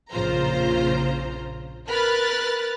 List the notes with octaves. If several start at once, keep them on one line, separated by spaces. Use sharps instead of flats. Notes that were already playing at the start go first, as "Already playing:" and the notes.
A#1 F2 C#3 F4 C5 A#5
A#4 B4 B5 F6 F#6 A6